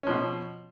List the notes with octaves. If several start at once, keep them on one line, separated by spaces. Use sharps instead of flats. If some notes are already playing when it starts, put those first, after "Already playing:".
B2 F3 C#4